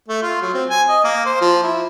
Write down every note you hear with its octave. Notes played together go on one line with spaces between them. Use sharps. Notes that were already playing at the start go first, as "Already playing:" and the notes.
A3
F4
F#3
C4
G#5
D#5
A#3
C5
F3
E4